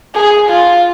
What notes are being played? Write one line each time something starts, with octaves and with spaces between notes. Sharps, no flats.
G#4
F4